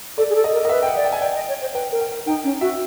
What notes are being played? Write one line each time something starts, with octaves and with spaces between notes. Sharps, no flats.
A4 D5
G#4
A4
D#5
A#4
A#4 D#5
B4 E5
G5
F#5
D5
G5
G#5
D5 G5
D#5
C#5
C5
B4 G5
A#4
G5
D#4 G5
C#4
F#4 E5